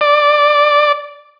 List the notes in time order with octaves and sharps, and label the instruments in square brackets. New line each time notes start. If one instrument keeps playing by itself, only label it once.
[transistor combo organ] D5